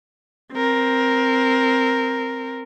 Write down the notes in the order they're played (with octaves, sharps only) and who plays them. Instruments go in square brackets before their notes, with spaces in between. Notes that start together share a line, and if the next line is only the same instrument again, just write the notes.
[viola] C4 A#4